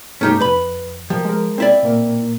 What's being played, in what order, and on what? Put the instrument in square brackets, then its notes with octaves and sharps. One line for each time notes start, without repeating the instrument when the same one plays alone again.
[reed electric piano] G2 A3 [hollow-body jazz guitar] C#4 D#4 G4
[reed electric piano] F2 [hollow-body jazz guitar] B4 B5
[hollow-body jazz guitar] F3 [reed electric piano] G4 A#4
[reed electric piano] G#3 A#4
[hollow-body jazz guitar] C4 E4 D5
[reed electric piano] A#2 A#3 A#4